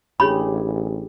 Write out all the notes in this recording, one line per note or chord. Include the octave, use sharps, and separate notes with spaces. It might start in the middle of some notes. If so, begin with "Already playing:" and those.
A1 D4 G4 G#4 C#5 B5